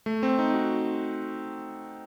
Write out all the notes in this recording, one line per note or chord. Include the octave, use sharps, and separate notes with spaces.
A3
C4
D#4
F#4